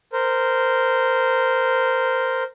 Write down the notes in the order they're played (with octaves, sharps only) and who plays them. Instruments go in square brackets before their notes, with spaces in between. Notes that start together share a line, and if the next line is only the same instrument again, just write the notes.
[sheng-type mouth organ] A#4 C5